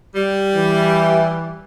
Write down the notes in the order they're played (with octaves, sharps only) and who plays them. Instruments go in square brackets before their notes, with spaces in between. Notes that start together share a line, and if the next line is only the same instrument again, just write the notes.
[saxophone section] G3
[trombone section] E3